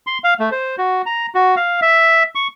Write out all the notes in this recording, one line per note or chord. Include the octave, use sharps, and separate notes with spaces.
C6
F5
A3
C5
F#4
A#5
F#4
F5
E5
C#6